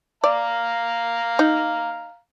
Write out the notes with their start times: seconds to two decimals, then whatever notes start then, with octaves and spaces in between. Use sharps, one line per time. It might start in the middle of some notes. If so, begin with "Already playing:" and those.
0.24 D5 F5 A#5
1.39 D#4